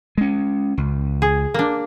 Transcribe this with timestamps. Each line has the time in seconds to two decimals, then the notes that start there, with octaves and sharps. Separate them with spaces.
0.18 G#3 C#4
0.78 C#2
1.22 G#4
1.54 A#3 D4